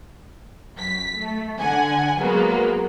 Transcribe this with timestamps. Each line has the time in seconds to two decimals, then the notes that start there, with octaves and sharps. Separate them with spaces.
0.75 F#2 B6
1.16 A3
1.59 D3 F#5 G#5
2.18 F#3 G#3 A#3 B3